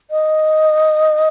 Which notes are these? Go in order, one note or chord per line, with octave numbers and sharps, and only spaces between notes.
D#5